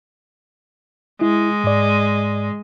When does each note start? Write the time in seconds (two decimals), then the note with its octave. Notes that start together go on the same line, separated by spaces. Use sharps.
1.21 G#3 E4
1.64 G#2 D5